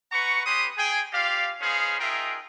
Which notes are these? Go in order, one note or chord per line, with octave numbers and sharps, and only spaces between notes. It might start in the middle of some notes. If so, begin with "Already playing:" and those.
B4 F#5 A#5 C#6
B3 C#4 G4 B4 C6 D#6
G#4 G5 G#5
F4 G4 D5 F5
B3 C#4 D#4 G#4 C5 F5
D#4 F4 G#4 A#4 E5 G5